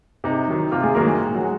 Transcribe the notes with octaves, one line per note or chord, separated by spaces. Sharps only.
C3 D#4
D#3 F#3
C3 F4
G#3 G#4
D#3 F#3 A#3 A#4
G#3 G#4
A#2
F#3 F#4
G#3